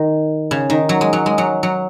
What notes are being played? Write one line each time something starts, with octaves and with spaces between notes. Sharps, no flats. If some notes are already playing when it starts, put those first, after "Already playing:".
Already playing: D#3
C#3
D#3
F#3
G#3
F#3
G#3
F#3
F#3